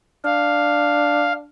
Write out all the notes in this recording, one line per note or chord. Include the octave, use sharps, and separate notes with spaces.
D4 F5